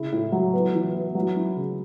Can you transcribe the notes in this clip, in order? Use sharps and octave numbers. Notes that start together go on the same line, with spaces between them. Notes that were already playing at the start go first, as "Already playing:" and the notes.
Already playing: C#3 E4
A2
F#3
B3
E3
B3
F#3
E4
C#3